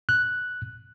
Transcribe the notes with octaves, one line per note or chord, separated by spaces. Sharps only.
F#6